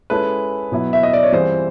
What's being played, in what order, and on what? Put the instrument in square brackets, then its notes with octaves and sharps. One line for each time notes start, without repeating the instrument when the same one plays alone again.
[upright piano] G#3 C#4 E4 A4 [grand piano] B4
[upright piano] B2 F#3 B3 E4
[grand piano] E5
D#5
D5
C#5
[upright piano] E3 G3 C4 F4 G#4 [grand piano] C5